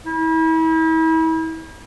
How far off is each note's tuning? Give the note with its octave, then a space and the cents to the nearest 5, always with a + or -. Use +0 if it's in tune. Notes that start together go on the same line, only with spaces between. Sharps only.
E4 -35